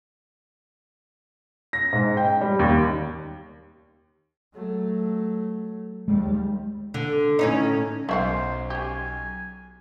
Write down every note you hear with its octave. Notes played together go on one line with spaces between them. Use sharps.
A#6
G#2
G5
G3
D#2
F#3 A3
D#2 G3 G#3
D3
A2 C#4 D#4
B1 C#4 C5 E5 F#5
C#4 G4 G#5